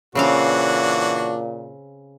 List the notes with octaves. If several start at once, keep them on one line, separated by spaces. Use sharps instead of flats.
A#2 C#3 E3 C4 D4 F#4 F5